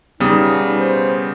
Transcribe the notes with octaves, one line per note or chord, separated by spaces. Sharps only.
C#3 G3 B3 D#4 D#6
C5